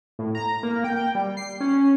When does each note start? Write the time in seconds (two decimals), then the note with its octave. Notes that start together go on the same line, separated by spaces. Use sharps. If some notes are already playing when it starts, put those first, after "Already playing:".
0.19 A2
0.35 A#5
0.63 A#3
0.84 G5
1.15 G3
1.37 C7
1.61 C#4